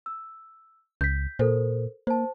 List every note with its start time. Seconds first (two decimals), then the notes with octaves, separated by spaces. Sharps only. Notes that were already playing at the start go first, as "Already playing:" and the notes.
0.06 E6
1.01 C#2 G6 B6
1.39 A#2 A4 A#4 C5
2.07 A#3 C5 A5